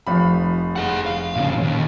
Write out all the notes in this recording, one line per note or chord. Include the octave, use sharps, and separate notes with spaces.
F1 F3 B5
G#4 F#5
F5
A#2 C#3
D#2